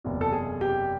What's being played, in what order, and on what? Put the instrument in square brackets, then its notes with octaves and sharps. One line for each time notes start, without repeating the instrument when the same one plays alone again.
[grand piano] F#1 E2 C3
A4
G#4
G4